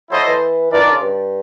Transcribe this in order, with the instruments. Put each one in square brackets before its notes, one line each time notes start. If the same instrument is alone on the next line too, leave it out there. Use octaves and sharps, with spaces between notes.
[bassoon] F#3 [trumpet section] E4 A4 C5 D#5
[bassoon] E3
[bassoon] E3 [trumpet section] D4 F4 A#4 D5
[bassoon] D#3
C#3
G2